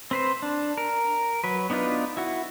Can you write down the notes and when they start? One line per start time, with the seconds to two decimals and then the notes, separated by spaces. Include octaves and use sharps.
0.11 C4 B4 C5
0.42 D4
0.78 A#4
1.44 F#3 B4
1.70 B3 D4 D#4 F4 B4
2.17 E4 F#4